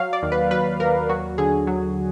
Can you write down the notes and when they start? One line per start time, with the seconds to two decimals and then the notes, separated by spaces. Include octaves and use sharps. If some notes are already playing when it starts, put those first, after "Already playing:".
Already playing: F#3 F5
0.13 D5
0.22 D#2
0.32 B4
0.51 F#3 B4
0.80 D#2 A#4
1.09 F#3 F#4
1.38 D3 G#4
1.67 F#3